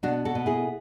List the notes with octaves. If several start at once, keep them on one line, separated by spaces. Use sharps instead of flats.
B2 D4 F#4
F#4 A4
B2
E4 G#4